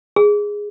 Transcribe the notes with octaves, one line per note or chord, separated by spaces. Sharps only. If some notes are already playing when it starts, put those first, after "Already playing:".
G#4